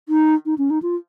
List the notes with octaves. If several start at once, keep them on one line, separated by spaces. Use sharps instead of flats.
D#4
D#4
C#4
D#4
F4